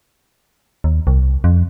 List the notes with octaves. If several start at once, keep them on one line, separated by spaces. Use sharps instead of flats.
D#2
C2
F2